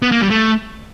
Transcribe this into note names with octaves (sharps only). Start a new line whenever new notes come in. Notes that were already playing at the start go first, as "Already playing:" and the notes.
B3
A#3
G3
A3